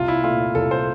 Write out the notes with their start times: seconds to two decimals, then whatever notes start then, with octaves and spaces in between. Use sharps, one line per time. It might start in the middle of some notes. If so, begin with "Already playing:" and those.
Already playing: C2 F4
0.08 E4
0.24 A#2 A3 F4
0.55 C2 A4
0.71 C5